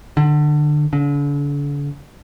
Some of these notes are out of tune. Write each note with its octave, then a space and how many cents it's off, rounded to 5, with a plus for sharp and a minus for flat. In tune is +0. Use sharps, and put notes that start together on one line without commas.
D3 +25
D3 -40